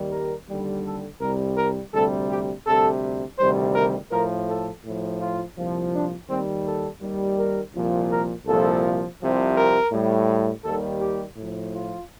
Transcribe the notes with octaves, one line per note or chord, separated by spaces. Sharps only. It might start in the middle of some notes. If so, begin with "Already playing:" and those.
Already playing: D#2 D#3 G3
A#4
D#2 D3 G3
A4
C2 C3 G3 A#4
A#4
D2 C3 G3 A4
G4
D2 C3 G3 A4
D2 C3 D#3 G3 C5
A#4
A2 F3 A#4
A4
A2 F3
F4
C2 A#2 F3
D4
D#2 D#3 G3 C4
A4
D#2 D#3 G3
A#4
C2 A#2 F3
A#4
C2 A#2 F3 A4
C2 C3 F3
A#4
A2 G3
D#2 D#3 G3 A4
G4
A2 F3
F4